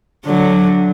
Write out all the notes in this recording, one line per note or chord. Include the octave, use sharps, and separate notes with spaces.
D3 F#3